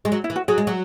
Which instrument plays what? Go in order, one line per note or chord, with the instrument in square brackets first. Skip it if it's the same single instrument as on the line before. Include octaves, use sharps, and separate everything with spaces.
[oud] G#3
F#3
[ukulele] E4
[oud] E3
[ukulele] F#4
[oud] F#3 [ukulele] G#4
[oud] G#3
F#3